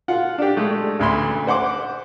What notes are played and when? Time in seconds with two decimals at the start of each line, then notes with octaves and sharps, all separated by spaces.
0.08 F4 F#5
0.38 D4 G4
0.57 G#3 A3
0.99 A1 D2 B5 C6
1.47 C5 F#5 C6 D6